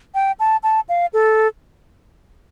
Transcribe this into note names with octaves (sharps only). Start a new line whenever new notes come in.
G5
A5
A5
F5
A4